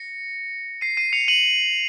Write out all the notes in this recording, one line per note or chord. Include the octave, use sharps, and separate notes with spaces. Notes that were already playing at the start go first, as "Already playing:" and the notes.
Already playing: A#6 C#7
C7 D#7
C7 D#7
C#7 F7
D#7 F#7